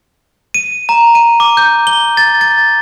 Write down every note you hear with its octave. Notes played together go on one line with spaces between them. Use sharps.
D#7
A#5
D#7
D6
G6
G7
A6
A6